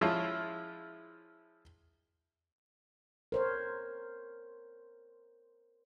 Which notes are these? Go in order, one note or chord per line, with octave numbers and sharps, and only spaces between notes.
F3 G#3 C#4 E4 F4
A#4 C5 C#5